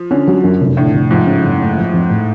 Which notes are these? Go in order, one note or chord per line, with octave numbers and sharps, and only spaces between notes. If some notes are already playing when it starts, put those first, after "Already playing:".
Already playing: F3
D3 C#4
F#3
F#2
F1
A2 D3
F1
G#2 F3
C#3
F#1
A3
F3
F2
A2